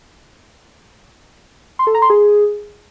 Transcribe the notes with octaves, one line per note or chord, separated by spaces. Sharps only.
C6
A4
A#5
C6
G#4